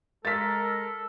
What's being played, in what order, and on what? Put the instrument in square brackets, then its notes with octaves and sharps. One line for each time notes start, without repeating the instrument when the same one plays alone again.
[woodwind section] G#3 A#4 [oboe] A4 [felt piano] A6 B6